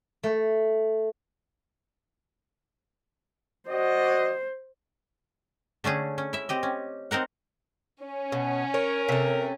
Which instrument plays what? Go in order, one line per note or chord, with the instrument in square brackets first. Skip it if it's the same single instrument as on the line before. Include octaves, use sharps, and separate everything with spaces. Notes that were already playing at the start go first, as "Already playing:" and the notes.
[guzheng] A3
[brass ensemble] F#4 D5 D#5 [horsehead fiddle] C5
[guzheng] D3 A3 C#4 G#4
C#4
E4 E5
C4 G4 D#5
C#4
C4 D#4 A#4 F#5
[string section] C#4
[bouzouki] B2
[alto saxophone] A#4 [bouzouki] C#5
[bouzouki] C3 A3